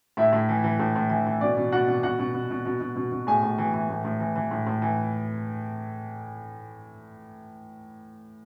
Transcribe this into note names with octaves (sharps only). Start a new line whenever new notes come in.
A2 E4 E5
A2
E3
E3
A2
A2
E3
E3
B2 D5
B2
B2 F#4 F#5
B2
B2 F#4 F#5
B2
B2
B2
B2
B2
B2
B2
A2 G#4 G#5
A2
E3
E3
A2
A2
E3
E3
A2
A2
E3